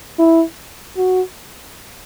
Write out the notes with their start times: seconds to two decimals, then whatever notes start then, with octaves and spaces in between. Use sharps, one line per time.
0.19 E4
0.97 F#4